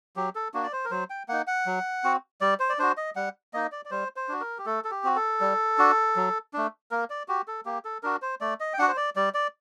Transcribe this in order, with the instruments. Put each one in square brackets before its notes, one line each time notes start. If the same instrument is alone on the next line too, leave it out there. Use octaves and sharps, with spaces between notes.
[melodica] F#3 G4
A4
A#3 D4 F#4
D5
C5
A#4
F#3 C5
G5
A#3 D#4 F#5
F#5
F#3
C4 F#4
G3 D5
C5
D5
D4 F#4 C5
D#5
G3 F#5
A#3 D#4 D#5
D5
D5
G3 C5
C5
D4 F#4
A#4
G4
A3 A4
A4
G4
C4 F#4
A4
G3
D4 F#4
F#3
A3 D4
A#3 A#4
D5
F#4 G4
A4
A#3 G4
A4
D4 F#4 A#4
C5
A3 D5
D#5
G5
D4 F#4 F#5
C5
D5
G3 D5
D5